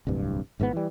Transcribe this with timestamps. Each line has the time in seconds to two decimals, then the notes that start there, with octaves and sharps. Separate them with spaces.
0.07 D1 C2 G2
0.60 G#1 G#2 D3 B3
0.73 E3 G3